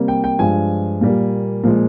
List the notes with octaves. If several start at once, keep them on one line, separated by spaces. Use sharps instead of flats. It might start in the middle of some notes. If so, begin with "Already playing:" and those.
Already playing: C3 G3 A#3
G5
G5
G2 F3 G#3 G#5
A#2 G3 A#3
A#2 F3 G#3